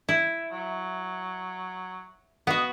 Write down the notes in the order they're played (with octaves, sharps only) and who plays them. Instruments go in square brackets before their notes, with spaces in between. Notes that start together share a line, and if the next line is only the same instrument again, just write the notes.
[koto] E4
[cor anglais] F#3
[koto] B3 F#4 [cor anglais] D#5